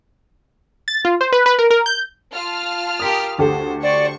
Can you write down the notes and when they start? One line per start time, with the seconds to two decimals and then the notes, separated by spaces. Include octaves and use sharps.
0.88 A6
1.05 F4
1.21 C5
1.32 B4
1.46 B4
1.59 A#4
1.70 A#4
1.86 G6
2.32 F4 A5 F6
3.00 G4 A#4 D#6 B6
3.38 D2 G4 A4 C5
3.83 C5 D5 C#6